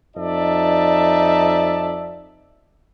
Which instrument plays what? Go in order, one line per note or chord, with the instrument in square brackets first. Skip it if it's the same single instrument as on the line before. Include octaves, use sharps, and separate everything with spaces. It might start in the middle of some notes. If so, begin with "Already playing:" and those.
[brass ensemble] F2 D#4 D5 E5 A5